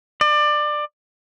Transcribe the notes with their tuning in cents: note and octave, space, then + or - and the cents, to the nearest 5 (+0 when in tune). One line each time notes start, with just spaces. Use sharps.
D5 +25